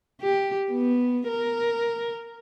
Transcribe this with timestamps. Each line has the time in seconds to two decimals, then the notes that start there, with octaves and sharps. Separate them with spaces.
0.21 G4
0.71 B3
1.28 A#4